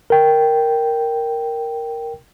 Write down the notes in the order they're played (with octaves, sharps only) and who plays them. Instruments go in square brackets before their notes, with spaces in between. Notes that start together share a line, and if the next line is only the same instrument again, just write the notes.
[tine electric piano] A#4 G5